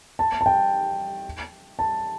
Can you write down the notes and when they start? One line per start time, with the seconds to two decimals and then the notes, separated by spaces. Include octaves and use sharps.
0.19 A5
0.41 A5
0.46 G5
1.79 A5